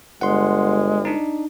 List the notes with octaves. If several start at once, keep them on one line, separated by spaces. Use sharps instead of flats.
G1 G#3 F#5 C6
D4 D#4